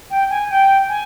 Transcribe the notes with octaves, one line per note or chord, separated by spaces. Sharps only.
G5
G#5
G5
G#5